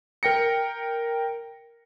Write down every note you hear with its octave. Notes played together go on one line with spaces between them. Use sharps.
A#4 G5 A#6 C#7